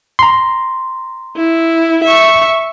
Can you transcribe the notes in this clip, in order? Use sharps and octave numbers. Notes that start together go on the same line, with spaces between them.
A#5 C6
E4
E5 C#6